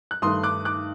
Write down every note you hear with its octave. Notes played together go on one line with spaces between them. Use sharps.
F#6
G2 D#3 A3 C6 D#6
D6 F#6
D6 F#6